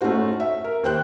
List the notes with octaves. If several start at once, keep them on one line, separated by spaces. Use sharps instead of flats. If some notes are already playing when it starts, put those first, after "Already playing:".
A3 C#4 D#4 F#4 C5
E5
A#4
D#2 C5 G5 F#6